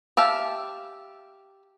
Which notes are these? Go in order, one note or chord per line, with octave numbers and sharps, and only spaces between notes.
G4 E5 F5 A5